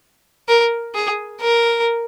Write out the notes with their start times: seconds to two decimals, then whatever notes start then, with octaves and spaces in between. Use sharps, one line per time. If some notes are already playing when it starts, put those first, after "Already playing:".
0.48 A#4
0.95 G#4
1.41 A#4